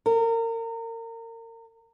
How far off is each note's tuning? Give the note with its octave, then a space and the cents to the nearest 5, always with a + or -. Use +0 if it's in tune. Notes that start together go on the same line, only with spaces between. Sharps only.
A#4 -30